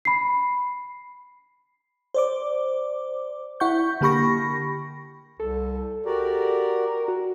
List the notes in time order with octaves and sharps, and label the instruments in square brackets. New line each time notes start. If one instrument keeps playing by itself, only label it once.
[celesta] B5 C7
[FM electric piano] C5 D5 D6
E4 F#5 C#6 G6
D3 A#3 G4 B5 C#6 A#6
[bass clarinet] C2 [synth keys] A4
[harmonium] F#4 D5 [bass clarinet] G4 [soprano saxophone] A#4
[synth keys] F#4